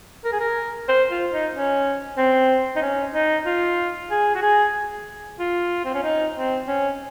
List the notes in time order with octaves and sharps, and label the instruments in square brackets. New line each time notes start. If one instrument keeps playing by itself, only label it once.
[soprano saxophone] A#4
G#4
A#4
C5
F4
D#4
C#4
C4
D#4
C#4
D#4
F4
G#4
F#4
G#4
F4
C4
C#4
D#4
C4
C#4